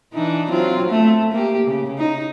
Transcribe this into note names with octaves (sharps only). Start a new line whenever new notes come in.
E3 D4 D#4
F#3 C4 F4
A3
A#3 G4
C#3
D#4